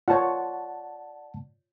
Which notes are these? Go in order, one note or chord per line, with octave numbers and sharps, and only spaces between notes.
F4 C#5 D5 F#5 A5